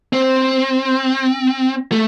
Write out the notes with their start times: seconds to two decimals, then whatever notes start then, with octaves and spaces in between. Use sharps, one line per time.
0.13 C4
1.92 A3